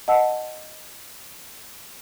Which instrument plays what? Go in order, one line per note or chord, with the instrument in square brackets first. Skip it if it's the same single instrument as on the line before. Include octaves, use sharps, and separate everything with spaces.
[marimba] D#5 F#5 A5 E6